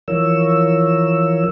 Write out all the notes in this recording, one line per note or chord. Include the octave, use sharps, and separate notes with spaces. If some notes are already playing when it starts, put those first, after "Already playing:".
E3 F3 A#4 C#5 E6